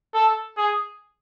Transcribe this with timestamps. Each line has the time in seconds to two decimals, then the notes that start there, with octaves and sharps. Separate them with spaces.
0.14 A4
0.57 G#4